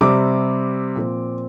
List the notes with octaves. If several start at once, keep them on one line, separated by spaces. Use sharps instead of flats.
C3 G3 C4 D6
A#2 F3 C4